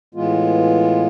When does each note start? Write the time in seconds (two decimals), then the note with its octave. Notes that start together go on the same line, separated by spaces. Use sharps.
0.14 A2 E3 G#3 B3 F4